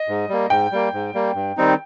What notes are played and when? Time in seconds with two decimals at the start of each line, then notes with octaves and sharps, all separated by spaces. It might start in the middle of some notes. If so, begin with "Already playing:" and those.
Already playing: D#5
0.08 G#2
0.29 G3 A#3
0.50 G#2 G5
0.72 G3 A#3
0.94 G#2
1.14 G3 A#3
1.35 G2
1.57 D#3 G3 C4 D#4